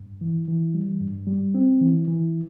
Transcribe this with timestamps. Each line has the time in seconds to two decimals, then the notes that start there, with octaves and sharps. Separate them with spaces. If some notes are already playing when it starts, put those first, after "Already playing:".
Already playing: G2
0.21 E3
0.48 E3
0.74 G3
1.00 G2
1.27 G3
1.54 C4
1.81 E3
2.08 E3